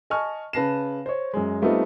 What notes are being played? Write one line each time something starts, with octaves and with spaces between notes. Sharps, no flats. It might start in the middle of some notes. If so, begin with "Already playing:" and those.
D#5 G#5 A5 C#6 F6
C#3 B4 A5 A#6 C7 E7
C5 C#5
F#2 G#3
G3 A3 B3 C4 D#4 F4